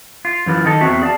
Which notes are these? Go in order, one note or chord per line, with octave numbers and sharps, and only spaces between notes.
F4
F#2 E3 E4 F4
D#3 D#4 A4
E2 F#3 C4 F#4 E5
G#4 D5 F5 A5